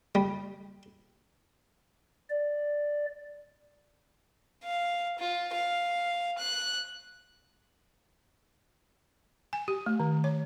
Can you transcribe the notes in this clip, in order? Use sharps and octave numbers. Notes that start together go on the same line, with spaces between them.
G3
D5
F5
F4
F5
F#6
G#5
G4
A3
D#3
C#5